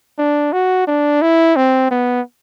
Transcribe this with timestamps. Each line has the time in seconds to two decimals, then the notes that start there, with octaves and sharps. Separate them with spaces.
0.19 D4
0.53 F#4
0.87 D4
1.22 E4
1.56 C4
1.91 B3